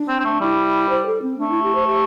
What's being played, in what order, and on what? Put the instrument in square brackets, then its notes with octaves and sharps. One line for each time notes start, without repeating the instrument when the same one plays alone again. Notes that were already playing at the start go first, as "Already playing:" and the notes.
Already playing: [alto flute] D4
[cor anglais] C4
C4
A3
[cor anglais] G3 [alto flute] E4
[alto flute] C5
A4
C4
[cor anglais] A3 [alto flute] D4
[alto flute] E4
G4
C5
G4